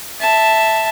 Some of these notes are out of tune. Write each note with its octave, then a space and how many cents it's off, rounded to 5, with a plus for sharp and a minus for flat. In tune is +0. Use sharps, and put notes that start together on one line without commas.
E5 +0 A5 +0